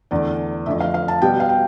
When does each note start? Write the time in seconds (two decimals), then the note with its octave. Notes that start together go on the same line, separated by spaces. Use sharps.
0.11 E2 D3 A3 D5
0.66 F2 D3 A3 E5
0.80 F5
0.94 F5
1.08 A5
1.22 B2 G3 B3 G5
1.40 F5
1.49 G5